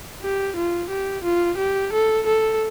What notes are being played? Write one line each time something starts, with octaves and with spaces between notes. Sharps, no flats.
G4
F4
G4
F4
G4
A4
A4